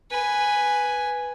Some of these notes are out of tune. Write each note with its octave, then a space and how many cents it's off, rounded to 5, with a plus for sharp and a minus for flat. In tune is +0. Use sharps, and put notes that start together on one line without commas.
B4 +0 G#5 +0